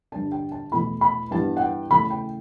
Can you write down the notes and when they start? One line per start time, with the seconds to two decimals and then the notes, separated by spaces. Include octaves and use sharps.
0.12 G2 D3 G3 D4 A5
0.32 G5
0.52 A5
0.72 E2 B2 A3 E4 B5
1.01 B5
1.31 G2 E3 G3 B3 A5
1.57 F#5
1.61 G5
1.90 C#3 E3 A3 B5
2.10 G5